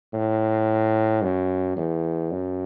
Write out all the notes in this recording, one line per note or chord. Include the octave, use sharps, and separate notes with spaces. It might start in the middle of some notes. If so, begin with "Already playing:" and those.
A2
F#2
E2
F#2